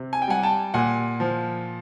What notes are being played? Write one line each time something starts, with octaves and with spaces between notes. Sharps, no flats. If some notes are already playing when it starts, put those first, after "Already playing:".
Already playing: C3
G#5
G5
G3 F#5 G#5
G5 A5
A#2 F#5 G#5
F3